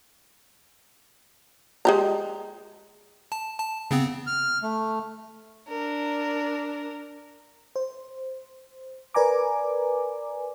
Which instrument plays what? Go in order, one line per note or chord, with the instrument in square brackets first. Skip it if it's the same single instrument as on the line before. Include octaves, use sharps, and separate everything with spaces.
[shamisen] G#3 G4 A#5
[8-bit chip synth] A5
A5
C#3 B3 C4
[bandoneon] F6
A3
[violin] D4 A#4
[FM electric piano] C5
A#4 B4 D5 G#5 A#5 D6